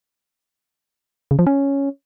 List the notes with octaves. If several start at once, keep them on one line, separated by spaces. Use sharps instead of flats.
C#3
F3
C#4